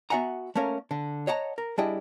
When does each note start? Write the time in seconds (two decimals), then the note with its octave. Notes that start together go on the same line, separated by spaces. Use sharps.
0.10 B3 F#4 E5 F#5 G#5 A#5
0.55 A3 A#3 C#4 A#4
0.91 D3
1.27 C#5 D#5 F#5 A5 A#5
1.58 A#4
1.78 G3 D4 E4 G#4 D#5 G5